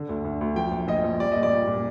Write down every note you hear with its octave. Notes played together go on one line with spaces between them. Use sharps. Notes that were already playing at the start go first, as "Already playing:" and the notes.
Already playing: D3
D2
D2
D2
F3 G5
A#1
A#1 D#5
A#1
G3 D5
A#2 D#5
D5
G3
A#2